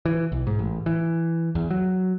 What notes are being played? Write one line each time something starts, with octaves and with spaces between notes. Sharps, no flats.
E3
B1
G#2
A1
E3
E2
F#3